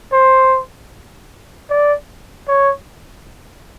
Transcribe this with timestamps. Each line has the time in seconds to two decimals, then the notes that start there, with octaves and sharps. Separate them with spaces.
0.13 C5
1.70 D5
2.48 C#5